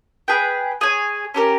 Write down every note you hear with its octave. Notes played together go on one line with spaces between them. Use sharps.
G#4 B4 G5
G#4 C#5 G#5
C#4 G4 A#4